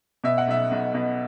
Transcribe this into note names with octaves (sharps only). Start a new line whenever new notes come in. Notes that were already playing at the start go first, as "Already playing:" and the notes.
B2 E5
F#5
B1 E5
B1
B2